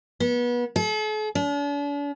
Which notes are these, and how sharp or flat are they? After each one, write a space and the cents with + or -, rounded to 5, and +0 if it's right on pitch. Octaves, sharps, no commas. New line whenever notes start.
B3 -30
A4 -45
D4 -45